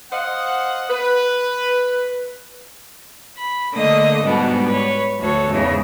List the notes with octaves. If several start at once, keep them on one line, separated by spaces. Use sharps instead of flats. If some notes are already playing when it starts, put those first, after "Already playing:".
C5 D#5 F5 F#5
B4
B5
D3 A3 A#3 D#5 D#6
G#2 B2 G3 B3 D4
B4 C#5
D2 F#4 A4 C#5
E2 G#2 C#3